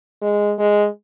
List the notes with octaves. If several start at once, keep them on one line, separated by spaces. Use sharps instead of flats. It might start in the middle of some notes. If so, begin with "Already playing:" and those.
G#3
G#3